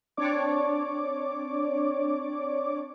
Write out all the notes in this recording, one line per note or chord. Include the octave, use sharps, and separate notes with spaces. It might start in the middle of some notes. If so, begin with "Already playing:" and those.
C4 D4 C#5 D5 D6